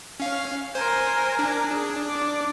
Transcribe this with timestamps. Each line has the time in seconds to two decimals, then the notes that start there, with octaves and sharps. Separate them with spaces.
0.20 C#4 F5
0.75 A#4 C5 G#5
1.39 D4
1.71 G#4
2.08 D5 D6